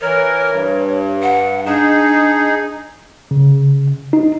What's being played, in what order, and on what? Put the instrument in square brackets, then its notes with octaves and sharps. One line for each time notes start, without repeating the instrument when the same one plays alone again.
[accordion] E3 A#4 [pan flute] C#5
[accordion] G2
[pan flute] F#5
[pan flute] D4 [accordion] D#4 G#4
[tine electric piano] C#3
D#4